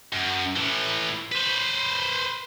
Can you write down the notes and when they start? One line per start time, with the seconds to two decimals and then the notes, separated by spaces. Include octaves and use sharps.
0.12 F#2
0.56 A2 E3
1.32 B4 C5